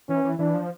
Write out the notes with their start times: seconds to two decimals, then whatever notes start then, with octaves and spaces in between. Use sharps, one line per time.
0.09 E3 C#4
0.24 E3
0.39 E3 D4
0.54 F3